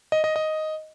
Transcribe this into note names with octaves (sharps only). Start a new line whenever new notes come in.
D#5
D#5
D#5